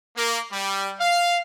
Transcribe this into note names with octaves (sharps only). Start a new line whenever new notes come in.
A#3
G3
F5